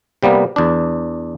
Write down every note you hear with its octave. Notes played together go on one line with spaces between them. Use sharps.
C3 G3 A#3 B3
E2 D4